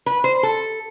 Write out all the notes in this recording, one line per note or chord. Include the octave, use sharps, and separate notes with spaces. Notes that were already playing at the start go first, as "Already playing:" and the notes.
B4
C5
A4